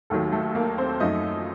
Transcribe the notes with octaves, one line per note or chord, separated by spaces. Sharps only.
D#2 D#3 F#3 A3 A4
A3 A4
A#3 A#4
C4 C5
F#2 F3 A3 D#4 D#5